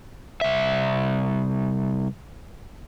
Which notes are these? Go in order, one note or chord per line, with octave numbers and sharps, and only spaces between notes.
C2 E5